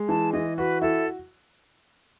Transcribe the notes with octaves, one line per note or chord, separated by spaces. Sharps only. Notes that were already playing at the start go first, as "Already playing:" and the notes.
Already playing: G#3
E3 A5
E3 D#5
F#4 B4
E4 A4